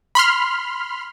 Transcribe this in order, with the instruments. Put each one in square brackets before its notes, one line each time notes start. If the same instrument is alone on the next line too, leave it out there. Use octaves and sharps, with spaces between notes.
[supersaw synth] B5 C6 F6